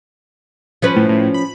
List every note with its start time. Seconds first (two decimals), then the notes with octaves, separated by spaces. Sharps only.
0.82 F3 C#4 B4
0.96 A2
1.09 A2
1.34 B5